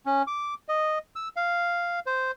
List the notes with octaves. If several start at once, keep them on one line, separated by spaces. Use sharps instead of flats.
C#4
D6
D#5
E6
F5
C5